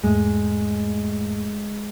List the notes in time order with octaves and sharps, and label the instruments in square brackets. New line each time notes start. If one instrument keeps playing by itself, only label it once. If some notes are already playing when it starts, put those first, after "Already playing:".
[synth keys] E2 G#2 A3 [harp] G#3